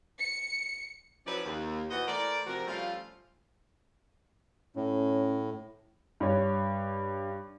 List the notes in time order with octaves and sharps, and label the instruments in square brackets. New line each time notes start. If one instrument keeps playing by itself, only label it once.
[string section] C#7
[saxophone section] F3 F#3 C#4 E4 B4 D5
D#2
B2 E3 C5 D#5 F#5
E3 A3 A#4 C5 D5
C3 F3 F#4 A#4
F3 G3 A3 C#4 F4
[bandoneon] A2 [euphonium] C#4
[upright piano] G2 C#5